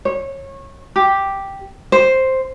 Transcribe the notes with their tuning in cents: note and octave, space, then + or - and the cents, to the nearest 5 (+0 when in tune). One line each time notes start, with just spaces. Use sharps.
C#5 -25
G4 +0
C5 +5